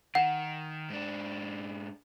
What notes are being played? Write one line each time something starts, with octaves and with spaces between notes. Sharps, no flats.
D#3 F#5
G#2 D4